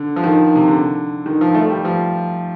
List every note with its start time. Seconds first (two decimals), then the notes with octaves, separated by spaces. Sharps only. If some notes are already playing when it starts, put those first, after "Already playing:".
Already playing: D3
0.16 F3
0.24 D#3
0.56 C3
0.68 D3
1.26 D#3
1.41 F3
1.54 A3
1.70 G3
1.85 F3